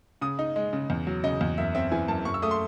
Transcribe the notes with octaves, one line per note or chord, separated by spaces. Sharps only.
C#3 D#6
D#4
G#3
C#3
E2
F#3
C#3 D#5
E2
F#2 E5
C4 E5
E3 G#5
F#2 A5
F#2 C#6
E6
A3 D#6
C6